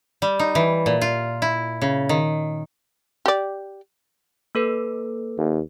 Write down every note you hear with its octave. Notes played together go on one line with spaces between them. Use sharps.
G3
D#4
E3
A#2
F4
E4
C#3
D#3
G4 D5
A#3 A4 B4
D#2